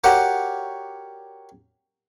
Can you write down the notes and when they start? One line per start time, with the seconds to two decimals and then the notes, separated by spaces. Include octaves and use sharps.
0.04 F#4 G4 A#4 C#5 D5 F#5